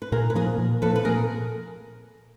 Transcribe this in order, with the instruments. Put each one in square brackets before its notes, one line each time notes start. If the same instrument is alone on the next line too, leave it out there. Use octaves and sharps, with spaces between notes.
[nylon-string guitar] B4
[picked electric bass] A#2 [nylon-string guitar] G#4 A#4
[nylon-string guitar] B4
[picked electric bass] F3 A#3 [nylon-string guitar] G#4 A#4
[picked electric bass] A#2
[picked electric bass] F3 [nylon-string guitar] A4 B4
[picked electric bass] A#3
[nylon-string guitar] B4
[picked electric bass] A#2 [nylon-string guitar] G#4 A#4